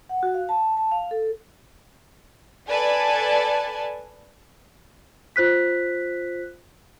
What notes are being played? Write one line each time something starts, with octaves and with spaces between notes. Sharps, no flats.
F#5
F#4
F5
A5
A5
F5
A4
A4 B4 D5 G#5 A5
F4 C5 F#6 B6